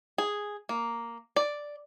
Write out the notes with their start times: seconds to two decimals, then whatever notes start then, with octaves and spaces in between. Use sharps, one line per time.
0.18 G#4
0.69 A#3
1.36 D5